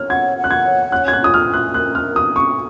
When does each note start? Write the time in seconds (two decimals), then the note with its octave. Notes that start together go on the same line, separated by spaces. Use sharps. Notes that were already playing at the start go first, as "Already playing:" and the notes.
Already playing: C#5 F6
0.10 F#5 G#6
0.37 F#5
0.44 F#6
0.51 G#6
0.65 C#5
0.92 C#4 F#6
1.08 G#6
1.13 F#6
1.20 F4 D#6
1.34 F6
1.47 C#4
1.54 F#6
1.74 A#4 F#6
1.95 F6
2.02 C#4
2.16 D#6
2.29 C#4
2.36 C#6